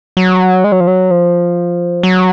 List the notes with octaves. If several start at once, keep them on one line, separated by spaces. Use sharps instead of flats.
F#3
G#3
F#3
F3
F#3
F3
F#3